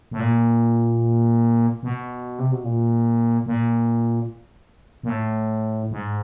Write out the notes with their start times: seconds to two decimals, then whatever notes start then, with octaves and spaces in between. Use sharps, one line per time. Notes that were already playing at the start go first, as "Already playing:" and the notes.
0.11 A2
0.20 A#2
1.83 B2
2.39 C3
2.52 B2
2.64 A#2
3.46 A#2
5.03 A#2
5.09 A2
5.91 G#2